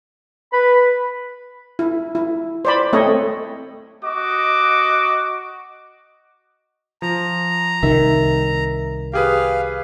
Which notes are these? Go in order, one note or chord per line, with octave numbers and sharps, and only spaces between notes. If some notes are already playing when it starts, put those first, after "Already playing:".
B4 B5
E4
E4
C5 D5 B5
A3 C4 A4 C#5 D#5
F#4 D#5 D6
F3 A#5
C2 D#3 E5
G4 G#4 B4 F5